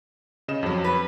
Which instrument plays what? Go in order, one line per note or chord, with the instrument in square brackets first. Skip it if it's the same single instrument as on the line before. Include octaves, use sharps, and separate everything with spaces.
[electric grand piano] C#3 D#5 E7
F2 F#3
[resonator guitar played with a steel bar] B4